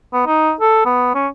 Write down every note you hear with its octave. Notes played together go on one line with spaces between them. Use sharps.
B3
D#4
A4
B3
C#4